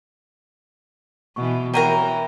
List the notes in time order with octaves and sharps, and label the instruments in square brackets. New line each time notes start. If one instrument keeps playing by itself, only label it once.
[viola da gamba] B2 E3 [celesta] C#6
[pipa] C3 F#3 A#4 [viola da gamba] E3 [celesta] G5 A#5 D#7